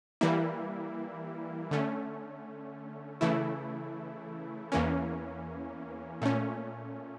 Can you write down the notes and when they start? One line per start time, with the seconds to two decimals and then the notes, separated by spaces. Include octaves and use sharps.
0.21 E3 G3 A#3 E4
1.71 D3 A3 C#4
3.21 C#3 E3 A3 E4
4.72 E2 E3 A#3 C#4
6.22 A#2 A3 C#4